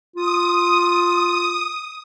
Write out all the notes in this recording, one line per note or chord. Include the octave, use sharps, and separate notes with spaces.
F4 D#6